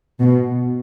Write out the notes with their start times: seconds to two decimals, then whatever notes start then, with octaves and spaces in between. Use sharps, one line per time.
0.22 B2